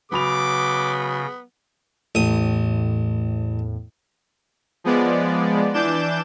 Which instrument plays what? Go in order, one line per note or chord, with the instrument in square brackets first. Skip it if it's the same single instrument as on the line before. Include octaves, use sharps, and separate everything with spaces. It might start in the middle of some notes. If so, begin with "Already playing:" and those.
[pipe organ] C#3 [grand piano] F#3 B5 F7 [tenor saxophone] B3 [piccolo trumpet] D6
[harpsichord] A1 D#6 [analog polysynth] E2 A2
[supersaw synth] F3 G#3 B3 D5
E3 D4 D6 G6 E7